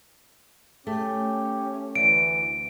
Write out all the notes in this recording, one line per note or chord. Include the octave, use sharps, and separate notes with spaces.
A3 C#4 G4
D2 E3 D7